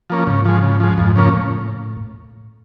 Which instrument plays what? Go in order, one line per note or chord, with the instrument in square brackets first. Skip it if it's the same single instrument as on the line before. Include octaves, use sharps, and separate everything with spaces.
[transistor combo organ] F3 A#3 C#4
[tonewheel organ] G#2 [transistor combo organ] C#3
[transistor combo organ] F3 G#3
C#3
F3 G#3
[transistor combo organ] F2 [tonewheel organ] G#2
[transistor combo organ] C#3 F3 A#3 C#4
[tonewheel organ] A2